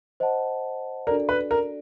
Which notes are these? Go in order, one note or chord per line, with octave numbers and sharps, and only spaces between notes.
C5 D#5 F#5 A5
D4 F#4 A4 A#4 D5
B4
A#4